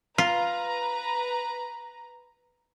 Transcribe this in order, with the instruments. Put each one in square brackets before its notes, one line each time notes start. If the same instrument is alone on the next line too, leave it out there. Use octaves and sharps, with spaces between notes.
[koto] F4 [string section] B4 A#5